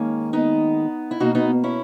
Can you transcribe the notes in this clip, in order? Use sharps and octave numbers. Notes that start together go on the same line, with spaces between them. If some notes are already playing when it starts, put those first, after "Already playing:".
Already playing: D#2 D#3 G#3 A#3 C#4
B3 D#4
E4
B2 A#3 D#4 F#4
B3 D#4
C#4 E4